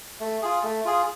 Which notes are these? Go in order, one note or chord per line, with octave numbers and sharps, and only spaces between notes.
A3
F4 G#4
A3
F4 G#4